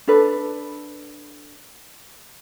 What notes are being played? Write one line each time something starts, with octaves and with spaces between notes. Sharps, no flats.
D4 A4 B4